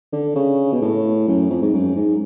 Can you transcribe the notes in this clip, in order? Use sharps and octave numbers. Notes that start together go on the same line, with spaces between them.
D3
C#3
B2
A2
F#2
F2
G#2
F#2
G#2